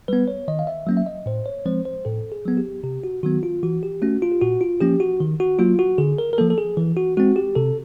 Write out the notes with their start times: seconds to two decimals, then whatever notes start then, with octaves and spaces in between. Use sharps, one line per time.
0.08 G3 B3 B4
0.28 C#5
0.48 D#3 D#5
0.59 F5
0.67 E5
0.87 F#3 A#3 C#4
0.97 E5
1.06 D#5
1.26 A2 C5
1.46 C#5
1.66 F3 G#3 C4 C5
1.85 C5
2.05 A2 A4
2.32 G#4
2.45 F#3 B3
2.57 G4
2.83 C3 G4
3.04 F#4
3.23 D#3 F#3 B3 F#4
3.43 F4
3.63 E3 F#4
3.83 G4
4.02 A3 C#4 F#4
4.22 F4
4.32 G4
4.41 A#2 F#4
4.61 F4
4.81 F3 A#3 C#4 G4
5.00 F#4
5.20 D#3
5.40 F#4
5.59 F#3 A#3 F4
5.79 F#4
5.98 D3 G#4
6.18 A#4
6.33 A#4
6.38 F3 A#3 A4
6.50 A4
6.58 G#4
6.77 E3
6.97 F#4
7.17 G#3 C4 F#4
7.36 G4
7.55 C3 A4